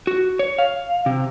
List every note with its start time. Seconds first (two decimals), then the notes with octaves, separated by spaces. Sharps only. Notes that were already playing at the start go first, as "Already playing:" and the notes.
0.07 F#4
0.39 C#5
0.58 F5
1.06 C3